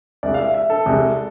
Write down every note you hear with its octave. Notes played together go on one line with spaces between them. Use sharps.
C2 C3 G#3 D5
F5
E5
E5
A4
C2 C3 G#3